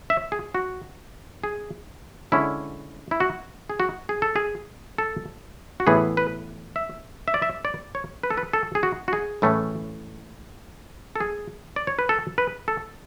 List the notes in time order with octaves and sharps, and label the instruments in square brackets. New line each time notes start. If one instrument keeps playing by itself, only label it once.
[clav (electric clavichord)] E5
G#4
F#4
G#4
D3 G#3 C#4 E4
E4
F#4
G#4
F#4
G#4
A4
G#4
A4
F#4
A2 E3 B3 G#4
B4
E5
E5
D5
E5
D5
C#5
B4
A4
B4
A4
G#4
F#4
F#4
G#4
A2 E3 A3 C#4
A4
G#4
D5
C#5
B4
A4
B4
A4